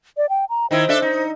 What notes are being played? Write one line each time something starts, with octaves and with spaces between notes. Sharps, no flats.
D5
G5
A#5
D#3 D#4 E4 C5
D4 A4 E5
D#4